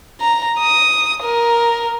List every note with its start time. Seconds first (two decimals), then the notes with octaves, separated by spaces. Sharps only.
0.20 A#5
0.59 D#6
1.23 A#4